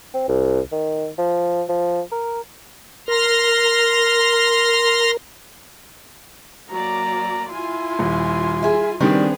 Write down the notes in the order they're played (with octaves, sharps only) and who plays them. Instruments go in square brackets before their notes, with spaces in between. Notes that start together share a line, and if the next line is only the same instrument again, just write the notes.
[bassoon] C4
C2
D#3
F3
F3
A#4
[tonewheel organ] A#4 [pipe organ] C6 F6 A#6
[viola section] F#3 A#3 D5 [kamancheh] A#5
[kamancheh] E4 C6 [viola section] F4 G#5
[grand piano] D#1
[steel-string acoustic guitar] G#4 E5
[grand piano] D#3 G3 [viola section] B3 G#4 [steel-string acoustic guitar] C4 D4